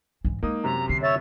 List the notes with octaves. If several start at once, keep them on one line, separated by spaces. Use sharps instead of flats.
G#2 E3
G#3 A#3 D#4 D#6
F#2 C3 A#5
D3 C7
C#5 E5 A6